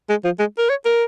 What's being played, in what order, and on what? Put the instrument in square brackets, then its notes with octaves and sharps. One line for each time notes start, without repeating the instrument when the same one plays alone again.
[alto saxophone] G#3
F3
G#3
A#4
C#5
A#4